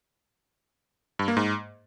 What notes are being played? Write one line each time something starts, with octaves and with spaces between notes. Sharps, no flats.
G2
A#3
G#2